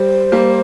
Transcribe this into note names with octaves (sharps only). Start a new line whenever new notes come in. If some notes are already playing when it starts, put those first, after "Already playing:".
Already playing: G3 C5
G3 A#3